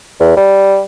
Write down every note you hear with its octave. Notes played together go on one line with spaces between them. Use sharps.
E2
G3